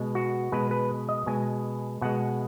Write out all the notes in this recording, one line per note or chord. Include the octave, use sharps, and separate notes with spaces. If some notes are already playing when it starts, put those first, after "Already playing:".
Already playing: B2 G#3
F#4
B2 G#3 B4
B4
D#5
B2 G#3 G#5
B2 G#3 F#5